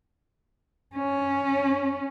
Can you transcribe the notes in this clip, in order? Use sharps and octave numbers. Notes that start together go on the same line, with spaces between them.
C#4